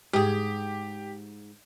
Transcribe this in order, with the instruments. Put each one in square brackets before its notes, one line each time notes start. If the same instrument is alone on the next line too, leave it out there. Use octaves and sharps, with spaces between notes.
[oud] G#2 G#4 [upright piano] G4